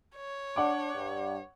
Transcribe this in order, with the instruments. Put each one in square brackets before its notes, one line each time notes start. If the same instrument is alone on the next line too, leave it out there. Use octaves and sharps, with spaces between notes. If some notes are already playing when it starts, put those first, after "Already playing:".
[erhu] C#5
[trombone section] D4 [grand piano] F#5 D6
[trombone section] G2